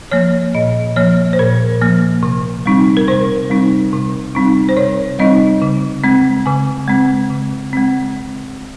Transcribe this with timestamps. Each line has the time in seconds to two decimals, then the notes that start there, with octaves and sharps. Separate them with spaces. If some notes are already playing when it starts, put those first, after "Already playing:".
0.11 F3 A#3 C#5
0.55 A#2 D#5
0.96 F3 A#3 C#5
1.33 C5
1.39 A#2 A#4
1.81 F3 A#3
2.23 C3
2.66 G3 C4 D#4
2.97 A#4
3.08 C3 C5
3.50 G3 C4 D#4
3.93 C3
4.35 G3 C4 D#4
4.69 C5
4.77 C3 C#5
5.19 G3 C4 D#4 D#5
5.62 C#3
6.04 G#3 C4
6.46 C#3 G#5
6.88 G#3 C4
7.30 C#3
7.73 G#3 C4